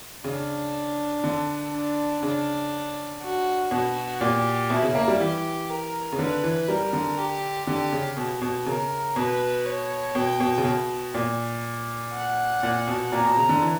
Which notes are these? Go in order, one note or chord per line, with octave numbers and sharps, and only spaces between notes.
C#3 D4
D3
D4
C#3 D4
F#4
B2 F#4
A#2 G4
B2 E4
C#3
A#3
G3
E3 G4
A#4
C#3
D3 B4
E3
G3 A#4
D3
G4
D3 G4
C#3
B2
B2
C#3 A#4
B2 B4
C#5
B2 G5
B2
C#3
B2
A#2
F#5
A#2
B2
A#2 A#5
B2
C#3
D3
E3